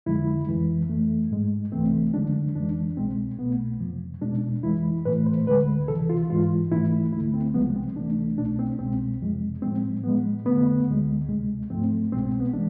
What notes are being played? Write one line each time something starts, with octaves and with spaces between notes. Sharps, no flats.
F2 D3 F3 G#3 E4
F2 E3 G#3
F2 E3 A3
G#2 G#3
C2 C3 E3 A3 C4
E2 D3 F3 G#3 D4
F2 E3 G#3 D4
C2 B2 G#3 C4
C2 B2 A3 B3
F2 C3 F3
E2 B2 G#3 D4
F2 E3 G#3 E4
A2 E3 A3 B4
C5
D2 D3 G#3 B4
D2 C3 E3 A4
F4
G#2 E3 G#3 F4
G#2 E3 A3 E4
D2 D3 A3 E4
C4
C2 C3 F3 G#3 B3
C4
D2 C3 E3 A3 D4
C2 B2 A3 D4
C4
C2 B2 G#3 C4
F2 C3 F3 G#3
A2 F3 G#3 C4
A2 F3 G#3 B3
F2 D3 A3 B3
D2 D3 G#3
D2 C3 G#3
G#2 F3 A3 C4
C2 B2 G#3 C4
C4
B3
E3 G#3 D4